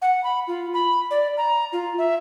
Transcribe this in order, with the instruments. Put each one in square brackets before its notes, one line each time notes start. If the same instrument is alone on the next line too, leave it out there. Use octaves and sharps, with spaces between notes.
[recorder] F#5
B5
F4
B5
D5
A#5
F4
E5